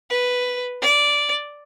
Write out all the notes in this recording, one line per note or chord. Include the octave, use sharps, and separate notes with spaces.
B4
D5